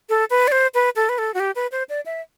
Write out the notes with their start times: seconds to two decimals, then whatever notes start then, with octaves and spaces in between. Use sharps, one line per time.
0.09 A4
0.30 B4
0.48 D5
0.52 C5
0.74 B4
0.96 A4
1.09 B4
1.18 A4
1.34 F#4
1.40 G4
1.56 B4
1.72 C5
1.89 D5
2.06 E5